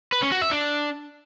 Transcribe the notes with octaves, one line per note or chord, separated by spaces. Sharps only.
B4
C#4
F#4
E5
D4